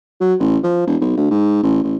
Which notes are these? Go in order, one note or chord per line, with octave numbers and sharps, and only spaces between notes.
F#3
A1
F3
E1
B1
D2
G#2
A1
A1